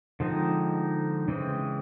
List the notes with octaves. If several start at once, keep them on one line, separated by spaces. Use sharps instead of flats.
D3 F3 G#3 C4 D#4
C#3 E3 G#3 C4